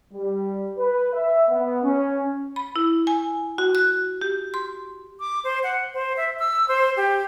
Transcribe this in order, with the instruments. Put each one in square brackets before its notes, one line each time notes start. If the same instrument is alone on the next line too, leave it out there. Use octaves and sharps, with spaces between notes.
[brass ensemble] G3
B4
E5
B3
C#4
[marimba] B5
E4
G#5
F#4
F#6
G4
C6
[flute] D6
C5
F#5
C5
E5
E6
C5
G4